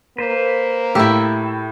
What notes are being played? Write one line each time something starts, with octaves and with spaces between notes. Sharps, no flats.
A#3 B4 C5
A2 E4 G4 E6